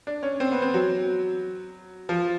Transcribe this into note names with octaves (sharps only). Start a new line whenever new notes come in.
D4
C#4
C4
B3
C4
F#3
F3